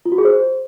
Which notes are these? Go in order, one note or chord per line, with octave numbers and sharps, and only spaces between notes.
F4
F#4
G#4
C5